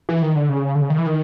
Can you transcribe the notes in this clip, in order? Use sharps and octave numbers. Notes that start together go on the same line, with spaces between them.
E3
D#3
D3
C#3
D3
C#3
D#3
E3
D#3